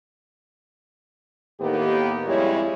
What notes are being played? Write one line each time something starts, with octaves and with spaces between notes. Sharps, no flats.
D#2 A2 D#3 A#3 B3 G4
F2 G3 G#3 E4 C#5